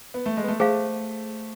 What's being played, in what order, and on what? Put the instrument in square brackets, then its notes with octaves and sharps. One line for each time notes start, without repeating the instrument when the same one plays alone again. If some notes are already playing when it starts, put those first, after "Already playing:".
[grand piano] B3
A3
G#3
B3
A3
[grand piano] A3 [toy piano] G#4 C5 F5